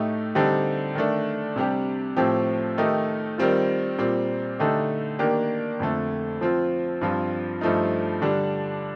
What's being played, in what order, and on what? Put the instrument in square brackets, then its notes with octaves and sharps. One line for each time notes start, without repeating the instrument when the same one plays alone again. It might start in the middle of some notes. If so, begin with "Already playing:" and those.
Already playing: [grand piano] A2 A3 D#4 G4
D3 G3 C4 D#4 G4
D#3 A3 D4
C3 G3 D4 G4
A2 F3 C4 G4
D#3 A3 D#4 G4
D#3 G3 C4 F4
A#2 G3 C4
D3 A3 D#4 G4
D#3 A#3 D4 G4
F2 D3 A3
F3 C4 F4
G2 F3 C4 F4
G2 F3 A3 D#4
D3 G3 D4